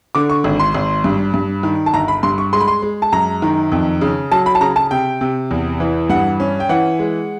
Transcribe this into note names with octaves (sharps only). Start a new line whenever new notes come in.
D3 D6
C#6
G#1
C6
G#1
G2
G2
D#3
A5
G1 A#5
B5
G2 C6
C#6
G#3 C6
B5
C6
G#3
A5
F#2 A#5
D#3
F2
C#3
F#3 A5
B5
A5
C#3 A#5
A5
C3 G5
C3
E2
E3
G2 F#5
C#4
G5
E3 F#5
G#3